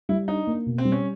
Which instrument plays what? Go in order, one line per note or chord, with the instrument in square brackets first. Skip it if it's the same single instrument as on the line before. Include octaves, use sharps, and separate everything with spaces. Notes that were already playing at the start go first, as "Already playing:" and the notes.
[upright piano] G3 [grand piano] E4
[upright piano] D4 [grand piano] D#4
[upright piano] A#3
B2
[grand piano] C4
[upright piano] G3
[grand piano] C#4